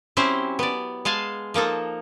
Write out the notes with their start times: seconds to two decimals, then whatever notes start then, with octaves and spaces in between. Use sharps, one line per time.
0.17 F#3 C4 C#4 E4 G4 C5
0.59 B3 D5
1.05 G#3 F5 G#5 A5
1.54 F3 A#3 D#4 A4